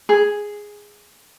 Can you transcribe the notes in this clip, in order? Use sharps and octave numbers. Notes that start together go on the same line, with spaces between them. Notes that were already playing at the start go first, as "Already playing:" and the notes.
G#4